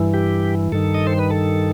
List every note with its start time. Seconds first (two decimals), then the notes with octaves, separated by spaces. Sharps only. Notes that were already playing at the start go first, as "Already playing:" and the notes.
Already playing: G2 E3
0.14 G4
0.72 G2 D#3 A4
0.95 D#5
1.07 C5
1.19 B4
1.30 A4